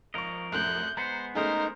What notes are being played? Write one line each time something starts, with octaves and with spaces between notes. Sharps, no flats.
G#1 F3 A#4 D#5 C#6
C2 F#2 A2 F#6 G6
G#3 B3 C5 F#5 A#5 A#6 C7
A3 C#4 D#4 G#4 A#4 C5